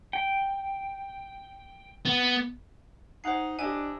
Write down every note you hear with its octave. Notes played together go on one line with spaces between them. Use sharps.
G5
B3
D#4 C5 F#5 G#5 C7
D4 E4 G4 D#5 G#5